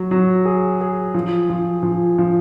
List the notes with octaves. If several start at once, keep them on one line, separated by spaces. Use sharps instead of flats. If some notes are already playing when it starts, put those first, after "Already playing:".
Already playing: F#3
F#3
G#4
G#4
F3
F3
F3
F3